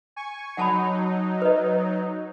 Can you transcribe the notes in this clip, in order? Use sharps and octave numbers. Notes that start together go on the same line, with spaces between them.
G#5 C#6
F#3 D#4 F#5 A5 B5
B4 D#5